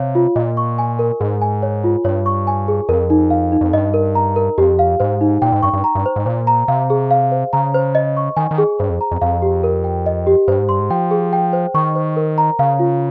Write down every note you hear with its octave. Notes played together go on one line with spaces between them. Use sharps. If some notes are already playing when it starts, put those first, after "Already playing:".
Already playing: C3 C#5 F5
F4
A#2 D#5
C#6
G#5
A#4
G#2 G#4
G#5
C#5
F4
G2 C#5
C#6
G#5
G#4
F2 A#4
D#4
F5
D#4
F2
G2 D#5
A#4
A#5
A#4
F2 G4
F5
G#2 C5
D#4
A#2 G5
G#2
G2 C#6
G2
A#5
G2
C5
G#2
A#2 C5
A#5
C3 F5
G#4
F5
C5
C#3 A#5
C5
D#5
C#6
D#3 G#5
D#3
G#4
G2 C5
F2
A#5
F2
F2 F5
G4
A#4
G5
D#5
G4
G2 C5
G#2
G2 C6
G#2
F3 G5
G#4
G5
C5
D#3 C#6
C5
A#4
A#5
C#3 F5
F4